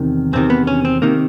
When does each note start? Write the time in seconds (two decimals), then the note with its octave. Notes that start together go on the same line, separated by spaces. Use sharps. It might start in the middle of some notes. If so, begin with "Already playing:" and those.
Already playing: E2 C3 D#3
0.33 E2 C3 D#3 C4
0.50 B3
0.67 C#4
0.85 C4
1.02 C3 D#3 A#3